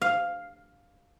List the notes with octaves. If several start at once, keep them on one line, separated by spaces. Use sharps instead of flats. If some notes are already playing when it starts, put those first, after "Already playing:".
F5